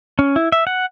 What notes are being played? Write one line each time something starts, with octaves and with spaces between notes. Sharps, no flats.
C#4
E4
E5
F#5